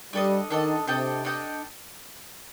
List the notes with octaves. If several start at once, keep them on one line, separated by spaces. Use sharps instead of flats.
G3 D4 A4 D#5
D#3 D4 A4 D#5
C3 D4 A4 D#5 G5
D4 A4 D#5 G5